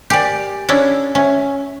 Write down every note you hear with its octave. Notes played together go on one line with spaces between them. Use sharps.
G4 A#4 D5 G5 G#5
C#4 D4 E4
C#4 E5 G#5